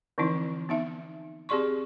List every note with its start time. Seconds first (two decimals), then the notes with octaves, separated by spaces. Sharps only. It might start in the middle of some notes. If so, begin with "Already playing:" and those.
0.18 D3 E3 F3 C4 D#4 E4
0.69 B3 D#4 E5
1.49 C4 G4 G#4 D5 C6 C#6